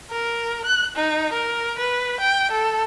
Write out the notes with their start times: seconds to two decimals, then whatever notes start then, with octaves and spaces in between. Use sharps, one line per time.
0.11 A#4
0.65 F#6
0.96 D#4
1.32 A#4
1.78 B4
2.20 G5
2.51 A4